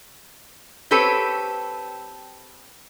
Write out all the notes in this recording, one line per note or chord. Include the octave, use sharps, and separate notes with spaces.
C4 G4 A4 B4 C#5